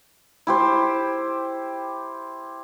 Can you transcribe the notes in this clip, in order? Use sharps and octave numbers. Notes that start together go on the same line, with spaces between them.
E4 G4 C5